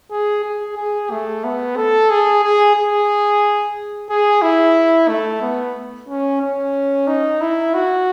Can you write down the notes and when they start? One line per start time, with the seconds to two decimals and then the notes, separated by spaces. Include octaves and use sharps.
0.11 G#4
0.44 G#4
0.77 G#4
1.11 A3
1.44 B3
1.76 A4
2.10 G#4
2.43 G#4
2.76 G#4
4.10 G#4
4.42 E4
5.08 A3
5.42 B3
6.09 C#4
6.42 C#4
7.07 D#4
7.41 E4
7.74 F#4